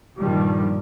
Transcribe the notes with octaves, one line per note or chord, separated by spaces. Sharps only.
G2 A#2 D#3 F3 G3